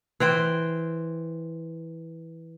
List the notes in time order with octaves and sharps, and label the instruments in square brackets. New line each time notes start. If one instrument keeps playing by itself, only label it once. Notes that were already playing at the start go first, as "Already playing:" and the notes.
[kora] E3 C5 G5